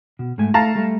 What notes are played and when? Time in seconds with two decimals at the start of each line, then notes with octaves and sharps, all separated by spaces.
0.19 B2
0.38 G#2 A3 G#5
0.54 A3 F5 A5 A#5
0.75 G3 A3